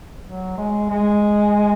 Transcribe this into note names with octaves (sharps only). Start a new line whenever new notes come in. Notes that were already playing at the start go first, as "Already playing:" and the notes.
F#3
G#3
G#3